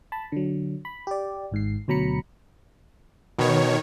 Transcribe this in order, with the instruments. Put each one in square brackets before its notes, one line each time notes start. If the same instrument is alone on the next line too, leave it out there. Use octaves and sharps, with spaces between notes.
[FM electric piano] A5 B5
D3 F#3
B5
G4 D5
G#1 G#2 C7
D2 B2 F#3 A#5 B5 C#7
[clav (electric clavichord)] B2 [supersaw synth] D#3 C#5